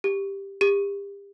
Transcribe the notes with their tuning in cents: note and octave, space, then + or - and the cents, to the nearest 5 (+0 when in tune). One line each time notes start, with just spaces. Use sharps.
G4 +10
G4 +35